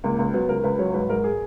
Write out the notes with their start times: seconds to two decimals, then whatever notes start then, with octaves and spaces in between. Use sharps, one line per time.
0.04 C#2 A#3
0.19 C#2
0.34 F#3 B3
0.49 C#2 A#4
0.64 C#2 B4
0.79 F#3 C#5
0.94 G#2 B4
1.09 G#2 A#4
1.24 G#4